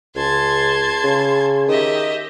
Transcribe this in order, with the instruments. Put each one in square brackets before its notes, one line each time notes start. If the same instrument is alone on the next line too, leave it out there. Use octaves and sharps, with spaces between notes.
[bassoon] C#2 [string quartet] A5 C6 G#6
[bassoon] C#3
[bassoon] D#3 [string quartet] G4 D#5 E5